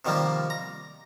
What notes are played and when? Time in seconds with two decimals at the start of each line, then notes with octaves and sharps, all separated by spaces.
0.05 C3 D#3 F3 G3 A#3
0.50 A#5